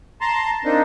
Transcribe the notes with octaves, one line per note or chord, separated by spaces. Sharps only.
A5 A#5 C6
A#3 C4 D4 D#4